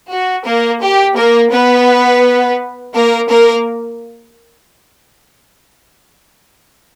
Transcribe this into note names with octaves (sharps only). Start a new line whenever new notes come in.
F#4
A#3 A#4
G4
A#3 A#4
B3 B4
A#3 A#4
A#3 A#4